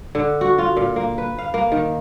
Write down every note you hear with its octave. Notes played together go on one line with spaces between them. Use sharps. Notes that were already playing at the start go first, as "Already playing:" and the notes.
D3
F#4
F4
A#2
A#3
B4
F5
A#3
D#3